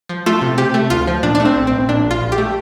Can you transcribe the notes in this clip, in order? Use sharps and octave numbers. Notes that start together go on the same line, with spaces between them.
F3
A3 F4
C3
C3 G4
A3
D2 F4
F3
A#2 D4
A3 D4
C4
A#1
A#1 C4
A#2 D4
A#1
F4
A#1
G4
A3